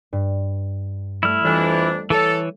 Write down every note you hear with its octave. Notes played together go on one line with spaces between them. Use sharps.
G2
G3 A3 E4 A4 F6
F2 E3 G3 D4 C#7 E7
E3 A4 C#5